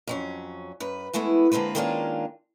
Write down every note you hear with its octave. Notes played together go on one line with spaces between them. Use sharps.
F2 F#3 C#4
F#2 B4
E3 G#3 A3 B3 E4
D3 G#3 A#3 C4 B4
D#3 G#3 A#3 C#4 D4 F4